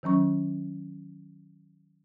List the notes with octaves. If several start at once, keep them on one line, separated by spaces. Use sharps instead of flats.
D#3 F#3 C#4 C#6